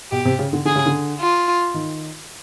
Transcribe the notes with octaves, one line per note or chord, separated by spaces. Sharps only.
B2 G4
C3
C#3
D3
D3 G#4
C#3
D3
F4
D#3